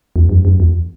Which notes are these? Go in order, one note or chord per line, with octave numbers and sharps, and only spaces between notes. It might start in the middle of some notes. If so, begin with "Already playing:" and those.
E2
F#2
F#2
E2